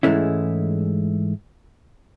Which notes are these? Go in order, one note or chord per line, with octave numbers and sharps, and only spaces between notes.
G#2 E3 G#3 A3 C#4 E4